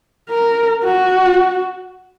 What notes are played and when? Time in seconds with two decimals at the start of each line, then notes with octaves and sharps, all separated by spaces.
0.30 A#4
0.84 F#4